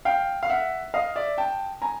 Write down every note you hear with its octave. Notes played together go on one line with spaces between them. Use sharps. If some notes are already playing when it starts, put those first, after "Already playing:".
F5 G5
F5
E5 F#5
D#5 F5
D5 E5
G5 A5
G#5 A#5